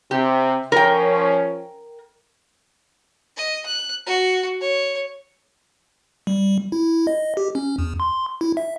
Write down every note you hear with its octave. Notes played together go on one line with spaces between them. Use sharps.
C3 G4
F3 C#4 A#4 G5
D#5
F#6
F#4
C#5
G3
E4
D#5
G4
C#4
E2
C6
E4
E5